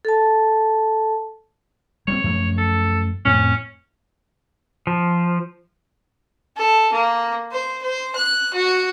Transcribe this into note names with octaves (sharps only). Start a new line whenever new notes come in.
A4 A5
G3 G#3 C4 C#5
F#2 F3 A3
A4
F2 A2 C4 C#4
F3
A4
A#3
C5
C5
F#6
F#4